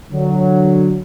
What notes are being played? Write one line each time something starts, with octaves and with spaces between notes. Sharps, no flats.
D3 F#3